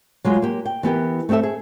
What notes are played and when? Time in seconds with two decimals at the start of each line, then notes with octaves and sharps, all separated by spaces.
0.24 F#3 G#3 F4 F#4
0.42 A#3 G4
0.65 G5
0.83 E3 B3 G4 A#4
1.29 A3 C4 G4 A4 E5
1.43 G#4